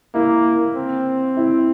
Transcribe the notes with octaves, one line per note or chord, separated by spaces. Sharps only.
A#3 E4
C4
E4